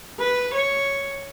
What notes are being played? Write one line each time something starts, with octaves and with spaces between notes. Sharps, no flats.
B4
C#5